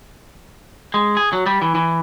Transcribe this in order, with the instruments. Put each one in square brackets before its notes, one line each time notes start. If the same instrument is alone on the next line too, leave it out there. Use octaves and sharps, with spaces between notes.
[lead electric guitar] G#3
G#4
F#3
G3
E3
E3